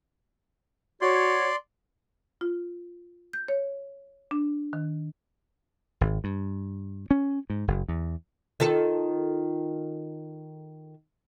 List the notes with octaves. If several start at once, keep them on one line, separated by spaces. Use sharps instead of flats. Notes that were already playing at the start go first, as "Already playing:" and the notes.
F#4 C#5 D5 C6
F4
G6
C#5
D4
D#3
G#1
G2
C#4
G#2
F#1
E2
D#3 F4 A4